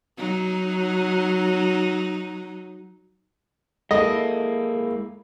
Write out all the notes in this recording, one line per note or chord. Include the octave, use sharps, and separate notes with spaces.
F#3 D#4
G#3 A#3 E4 A4 D#5